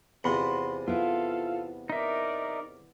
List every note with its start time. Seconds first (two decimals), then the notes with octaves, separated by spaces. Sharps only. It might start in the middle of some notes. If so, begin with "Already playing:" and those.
0.24 E2 C3 F3 F#5 B5 C6
0.88 B3 E4 F4 A4 F5
1.90 D#4 A#4 D5 E5